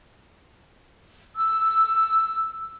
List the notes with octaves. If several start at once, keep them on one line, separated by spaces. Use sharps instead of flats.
E6